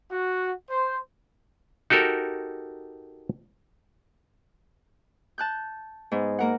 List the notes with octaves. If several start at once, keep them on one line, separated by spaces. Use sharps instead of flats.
F#4
C5
D#4 F#4 G4 A4 A#4
A5 F#6 G6
G#2 B3
A#3 A#4 F#5